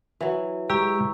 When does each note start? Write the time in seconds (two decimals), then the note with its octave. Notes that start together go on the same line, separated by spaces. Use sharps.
0.21 E3 F#3
0.70 G#3 G4 A#5 C#6 E6